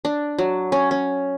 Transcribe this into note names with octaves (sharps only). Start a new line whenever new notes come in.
D4
F#3
C#4
C#4